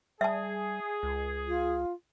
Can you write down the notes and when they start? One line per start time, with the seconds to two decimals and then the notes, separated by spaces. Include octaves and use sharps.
0.21 G3 G#4 E5 A5
1.03 C#2
1.48 F4